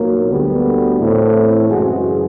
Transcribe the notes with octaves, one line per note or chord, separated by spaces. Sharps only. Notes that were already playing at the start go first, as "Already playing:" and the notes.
Already playing: B1 A#2 F#3 A#3
D2 D3 G3 B3
A2 E3 A3 C4
F#2 C#3 E3 G#3 F#4 G#4